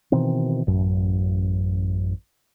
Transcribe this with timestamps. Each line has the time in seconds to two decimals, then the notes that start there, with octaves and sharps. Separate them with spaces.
0.12 B2 D#3 E3 C4
0.67 A1 F#2